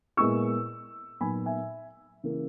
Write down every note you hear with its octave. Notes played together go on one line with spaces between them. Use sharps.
A#2 G#3 B3 E4 C#6 E6
A#2 F#3 B3 D#4 G#5 B5
E5 G#5
C#3 E3 A#3 C#4